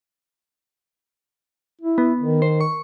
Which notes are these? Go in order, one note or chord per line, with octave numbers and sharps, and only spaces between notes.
E4
B3
D#3
C5
C#6